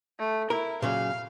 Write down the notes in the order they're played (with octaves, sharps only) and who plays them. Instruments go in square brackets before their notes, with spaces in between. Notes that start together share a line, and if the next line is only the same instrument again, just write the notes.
[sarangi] A3
[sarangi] E4 [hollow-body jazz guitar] A#4
[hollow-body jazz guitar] A#2 C#3 F#3 [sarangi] F5